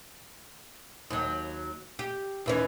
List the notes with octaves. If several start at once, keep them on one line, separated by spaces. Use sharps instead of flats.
D#2 F#3
G4
D#2 E3 C#4